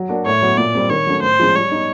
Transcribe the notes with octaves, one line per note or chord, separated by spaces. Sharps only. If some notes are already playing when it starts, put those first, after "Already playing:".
Already playing: F#3
A#3 D4 F#4
A2 C#5
F#3 B3
A#2 D5
G3 C4
D#3 C#5
F#3 A3 C#4
A2 C5
F3 G#3 C#4
G3 C#5
B3 D#4